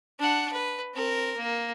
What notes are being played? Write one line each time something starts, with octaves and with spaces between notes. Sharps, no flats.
D4 F#5
B4
C4 A#4
A#3